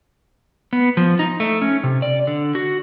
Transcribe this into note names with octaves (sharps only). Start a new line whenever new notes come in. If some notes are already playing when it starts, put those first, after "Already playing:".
B3
F3
D#4
A3
C#4
C3
D5
D3
F#4